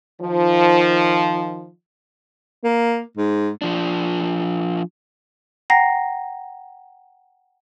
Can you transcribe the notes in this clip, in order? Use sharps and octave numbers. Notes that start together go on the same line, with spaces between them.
D#3 F3
A#3
G#2
F3 D4
F#5 G5 A#5 A#6 C7